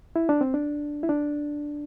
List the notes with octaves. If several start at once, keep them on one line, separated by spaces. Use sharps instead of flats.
E4
D4
C4
D4
E4
D4